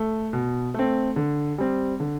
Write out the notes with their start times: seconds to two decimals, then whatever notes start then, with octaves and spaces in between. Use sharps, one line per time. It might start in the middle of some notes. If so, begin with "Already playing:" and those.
Already playing: A3
0.33 B2
0.74 A3 C4
1.16 D3
1.58 G3 C4
2.00 D3